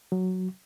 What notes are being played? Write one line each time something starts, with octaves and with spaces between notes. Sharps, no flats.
F#3